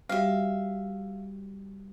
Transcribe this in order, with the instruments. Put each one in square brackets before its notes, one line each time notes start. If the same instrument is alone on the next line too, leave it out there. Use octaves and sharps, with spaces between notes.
[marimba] G3 F#4 G4 [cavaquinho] E5 F5